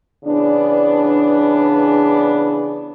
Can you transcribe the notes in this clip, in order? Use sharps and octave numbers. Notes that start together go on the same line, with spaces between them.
C#3 E3 B3 D4